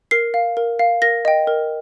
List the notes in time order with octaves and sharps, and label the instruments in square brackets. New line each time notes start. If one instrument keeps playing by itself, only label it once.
[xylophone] A#4 C7
F5
A#4
F5
A#4 A#6
D#5 G5
A#4